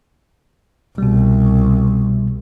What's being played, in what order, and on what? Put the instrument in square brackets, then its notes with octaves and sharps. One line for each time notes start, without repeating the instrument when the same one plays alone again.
[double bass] C2 [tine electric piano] B2 G3